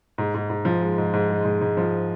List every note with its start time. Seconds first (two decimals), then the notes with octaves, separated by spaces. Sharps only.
0.18 G#2
0.34 G#2
0.50 G#2
0.65 F3
0.81 G#3
0.98 G#2
1.13 G#2
1.30 G#3
1.45 G#2
1.61 G#2
1.77 F3